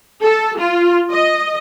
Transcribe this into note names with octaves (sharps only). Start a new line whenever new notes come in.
A4
F4
D#5